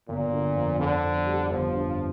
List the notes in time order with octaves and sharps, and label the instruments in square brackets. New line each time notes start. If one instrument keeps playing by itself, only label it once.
[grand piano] G1 [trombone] A#2
[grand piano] D3
F2
[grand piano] F2 [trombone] D3
[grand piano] F2
G3
[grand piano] G1 [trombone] F3
[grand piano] G2